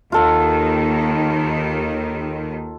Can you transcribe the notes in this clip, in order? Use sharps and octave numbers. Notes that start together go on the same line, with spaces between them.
D#2 D#3 F4 A4 F#5